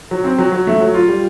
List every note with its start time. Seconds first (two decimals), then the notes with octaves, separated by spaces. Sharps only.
0.11 F#3
0.24 C4
0.38 F#3
0.52 F#3
0.67 A3
0.80 F#3
0.94 F4
1.08 G3